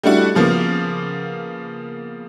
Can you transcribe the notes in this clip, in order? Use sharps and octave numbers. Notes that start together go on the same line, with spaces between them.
G3 A3 D4 E4 F#4
C#3 F3 A#3 B3